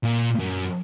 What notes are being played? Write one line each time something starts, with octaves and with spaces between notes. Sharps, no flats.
A#2
F#2